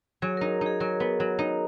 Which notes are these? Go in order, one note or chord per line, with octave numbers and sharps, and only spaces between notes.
F#3 G#4
D#4 A#4
D#4
G#4
F#3 A#4
B3
F#3
D#4